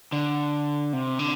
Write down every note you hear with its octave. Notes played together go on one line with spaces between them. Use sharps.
D3
C3
D3